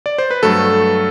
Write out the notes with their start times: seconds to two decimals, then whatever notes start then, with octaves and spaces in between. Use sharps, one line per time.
0.06 D5
0.18 C5
0.31 B4
0.43 G2 F#3 A3 A4